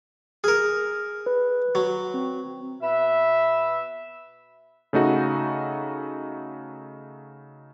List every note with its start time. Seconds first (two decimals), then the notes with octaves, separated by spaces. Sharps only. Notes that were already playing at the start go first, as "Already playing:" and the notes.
0.44 G#4 A#4 F6
1.26 B4
1.75 F#3
2.14 C4
2.81 B2 B4 E5
4.93 C#3 A3 D#4 F#4